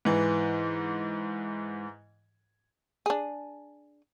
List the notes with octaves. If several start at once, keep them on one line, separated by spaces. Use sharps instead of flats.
G#2 E3
D4 G#4